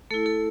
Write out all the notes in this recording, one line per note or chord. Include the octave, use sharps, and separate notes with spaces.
A3 E4 A4
A4